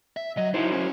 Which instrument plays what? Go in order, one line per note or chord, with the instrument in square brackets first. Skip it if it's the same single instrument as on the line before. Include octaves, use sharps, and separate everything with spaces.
[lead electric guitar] E5
[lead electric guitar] F#3 [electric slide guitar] D#5
[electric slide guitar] F#3 E4 C5 [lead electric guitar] D#4
[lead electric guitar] C#4